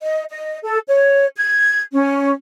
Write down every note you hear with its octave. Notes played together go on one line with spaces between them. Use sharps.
D#5
D#5
A4
C#5
G#6
C#4